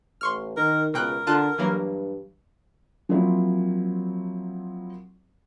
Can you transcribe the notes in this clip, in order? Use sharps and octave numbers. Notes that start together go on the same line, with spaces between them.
A1 C6 C#6 F6
D#3 A#4
C#2 B2 A#4 G5 F#6
D3 F4 A5 F#6
G2 E3 F#3 A#3
F3 F#3 A#3 C4 E4